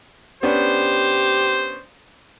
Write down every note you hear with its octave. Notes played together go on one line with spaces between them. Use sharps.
B3 C#4 D4 G4 C5